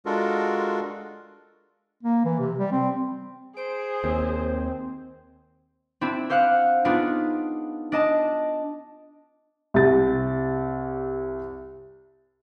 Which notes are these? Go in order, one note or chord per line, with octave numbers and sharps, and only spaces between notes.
G#3 D4 F4 F#4 A4 A#4
A#3
E3
C3
G3
C4
G#4 C5 D7
D#2 C4
C4 D4 E4
G4 C5 F5 F#5 F#6
B3 D4 D#4 F4 G#4
D4 D#5 A5
C2 C3 A6